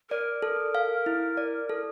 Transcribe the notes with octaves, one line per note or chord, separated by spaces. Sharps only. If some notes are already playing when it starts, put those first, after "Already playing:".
A#4 D5
A4
F5
E4
D5
A4